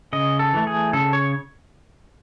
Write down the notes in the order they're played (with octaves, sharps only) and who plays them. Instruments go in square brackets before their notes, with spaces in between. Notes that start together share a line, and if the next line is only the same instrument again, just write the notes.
[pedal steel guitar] C#3 D#5
A4
E3 A3
G#4
C#3 A4
C#5